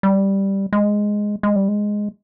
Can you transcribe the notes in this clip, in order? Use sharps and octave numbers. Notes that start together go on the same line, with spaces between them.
G3
G#3
G#3
G3
G#3